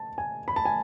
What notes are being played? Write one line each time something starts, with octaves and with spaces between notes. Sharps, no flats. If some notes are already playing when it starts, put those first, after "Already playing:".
Already playing: A5
G#5
B5
A5
G#5